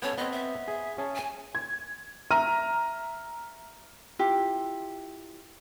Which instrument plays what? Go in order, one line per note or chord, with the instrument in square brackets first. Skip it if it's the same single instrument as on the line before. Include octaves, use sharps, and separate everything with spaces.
[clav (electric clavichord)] B3 C#4 A4 [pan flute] C#5
[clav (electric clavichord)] B3 C4 [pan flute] D#5
[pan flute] E5
[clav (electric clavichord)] G#4
C#4 G#4 A5
[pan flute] G#5
[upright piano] G#6
E5 A#5 F6 D#7
[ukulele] E4 F4 G4